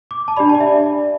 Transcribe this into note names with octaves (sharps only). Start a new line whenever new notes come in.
D6
A5
D4 G4 D5 B5
A5
D5
E5